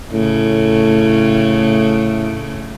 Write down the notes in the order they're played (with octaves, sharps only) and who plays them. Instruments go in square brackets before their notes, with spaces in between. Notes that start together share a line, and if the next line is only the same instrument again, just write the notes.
[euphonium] A2 [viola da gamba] C#3 A3